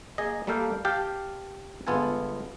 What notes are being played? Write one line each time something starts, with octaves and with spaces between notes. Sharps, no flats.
A#3 G#4 D#5
G3 A3 A#3 A4 F5 G5
G4 F5 G5 A5
G1 G#3 B3 F4 A4 G#5